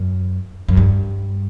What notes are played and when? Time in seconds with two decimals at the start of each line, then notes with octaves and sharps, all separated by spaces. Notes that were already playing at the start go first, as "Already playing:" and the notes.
Already playing: F#2
0.68 F#2
0.77 G2